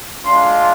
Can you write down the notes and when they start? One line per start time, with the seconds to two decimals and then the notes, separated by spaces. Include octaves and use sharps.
0.24 G#3 D4 F4 C6